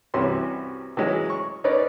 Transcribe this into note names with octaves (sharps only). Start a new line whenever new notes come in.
C2 C3 E3 C#4 F#4 C6
E3 F#3 G#3 C#4
C#6
C#4 D#4 A#4 B4 C#5 D5